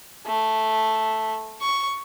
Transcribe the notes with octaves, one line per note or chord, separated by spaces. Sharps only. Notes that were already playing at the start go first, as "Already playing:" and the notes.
A3
C#6